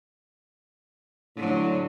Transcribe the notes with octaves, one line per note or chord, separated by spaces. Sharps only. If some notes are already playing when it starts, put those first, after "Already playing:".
A2 D3 F#3